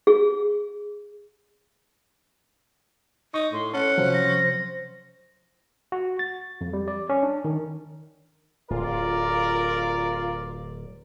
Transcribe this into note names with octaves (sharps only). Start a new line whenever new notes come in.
G#4
D#4 C#6
A2 C6
C#4 A4 F#5
C3 F3 F#3 C5
A#6
F#4
A6
F2
G3
D5
C#4
D4
D#3
D1 F4 A#4 D5